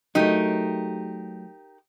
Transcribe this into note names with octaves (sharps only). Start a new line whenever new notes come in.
F#3 A3 D#4 G4 A#4